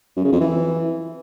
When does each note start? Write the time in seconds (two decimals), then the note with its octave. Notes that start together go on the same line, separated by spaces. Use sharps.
0.17 F#2
0.25 C#3
0.33 F2
0.41 E3